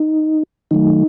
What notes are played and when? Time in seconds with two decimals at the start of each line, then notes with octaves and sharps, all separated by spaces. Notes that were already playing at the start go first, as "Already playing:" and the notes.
Already playing: D#4
0.71 D#3 F#3 A3 D#4